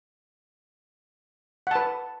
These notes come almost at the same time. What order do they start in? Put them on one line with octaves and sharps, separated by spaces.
F#5 A5 B4